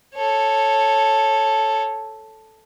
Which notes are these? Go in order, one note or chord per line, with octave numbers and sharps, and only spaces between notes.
A4 C#5